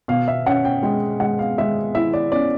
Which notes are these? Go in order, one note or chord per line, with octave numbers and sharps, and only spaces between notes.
B2 F5
E5
C#4 F#5
G5
G#3 G5
G#3 F#5
F5
G#3 E5
E4 E5
D5
C#4 D5